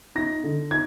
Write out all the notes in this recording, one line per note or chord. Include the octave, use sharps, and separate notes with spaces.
D#4 A#6
D3
D#4 G#6